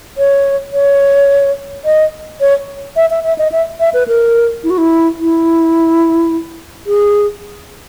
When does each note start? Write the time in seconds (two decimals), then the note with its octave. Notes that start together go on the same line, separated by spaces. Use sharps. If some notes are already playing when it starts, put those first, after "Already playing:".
0.18 C#5
0.74 C#5
1.85 D#5
2.41 C#5
2.96 E5
3.10 E5
3.24 E5
3.38 D#5
3.52 E5
3.80 E5
3.94 B4
4.08 A#4
4.64 E4
4.70 F#4
4.78 E4
5.19 E4
6.86 G#4